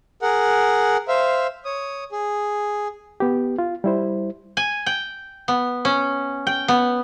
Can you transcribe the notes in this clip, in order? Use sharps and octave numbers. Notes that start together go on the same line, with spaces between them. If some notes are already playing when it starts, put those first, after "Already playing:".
G#4 A#4 F#5
C5 E5 F5
C#5 D#6
G#4
B3 G4
F4
G3 E4 C5
G#5
G5
B3
C#4
G5
B3